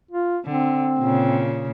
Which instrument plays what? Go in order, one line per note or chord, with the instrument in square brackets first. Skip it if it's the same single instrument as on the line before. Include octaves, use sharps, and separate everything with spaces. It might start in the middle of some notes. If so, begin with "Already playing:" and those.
[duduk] F4
[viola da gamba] D3 [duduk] C4
[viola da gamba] A#2 C#3